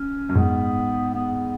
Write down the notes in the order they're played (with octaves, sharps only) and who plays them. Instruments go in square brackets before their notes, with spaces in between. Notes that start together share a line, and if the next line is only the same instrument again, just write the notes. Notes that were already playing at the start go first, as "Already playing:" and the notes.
Already playing: [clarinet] C#4
[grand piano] F#2
[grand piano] G#2 [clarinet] B3
[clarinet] B3